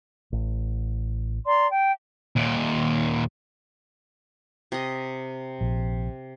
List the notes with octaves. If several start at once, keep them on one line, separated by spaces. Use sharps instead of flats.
A1
D5 A#5 C6
G5
D#2 A#2
C3 D#5
A#1